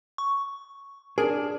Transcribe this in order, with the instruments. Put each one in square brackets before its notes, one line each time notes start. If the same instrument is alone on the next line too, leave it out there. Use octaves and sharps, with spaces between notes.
[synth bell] C#6
[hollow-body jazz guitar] D4 G#4 [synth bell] A#4